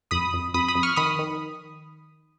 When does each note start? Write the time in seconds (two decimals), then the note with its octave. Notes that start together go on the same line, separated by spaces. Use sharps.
0.11 F2 B5 D#6
0.33 F2
0.54 F2 B5 D#6
0.68 B5 D#6
0.75 F2
0.83 C#6 F6
0.96 D#3 B5 D#6
1.19 D#3